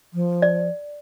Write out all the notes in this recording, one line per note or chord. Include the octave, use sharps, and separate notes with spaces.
F3
D5